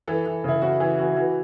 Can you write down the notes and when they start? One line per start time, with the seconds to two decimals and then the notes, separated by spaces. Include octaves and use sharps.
0.08 E3 A4
0.26 E3
0.44 C#3 E4
0.62 C#3 F#4
0.80 E3 G#4
0.98 E3 F#4
1.16 E3 F#4